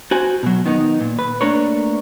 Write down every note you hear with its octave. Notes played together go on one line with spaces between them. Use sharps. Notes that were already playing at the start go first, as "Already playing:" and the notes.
F#4 C5 G#5
B2 F#3
D#3 B3 D#4
A#2
B4
A3 A#3 D4 A#4 B4 C#5